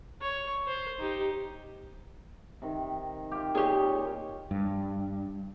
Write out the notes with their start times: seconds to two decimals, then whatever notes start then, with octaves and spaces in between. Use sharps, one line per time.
0.21 C#5
0.67 C5
0.99 D#4 G4
2.62 C3 D#3
3.31 F4 G4
3.55 A#2 D#4 G4 G#4 C#5
4.51 G2